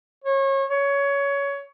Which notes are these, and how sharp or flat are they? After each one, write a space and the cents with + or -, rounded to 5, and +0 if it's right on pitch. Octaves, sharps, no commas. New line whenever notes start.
C#5 -30
C#5 +20